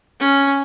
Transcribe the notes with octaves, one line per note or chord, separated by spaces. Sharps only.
C#4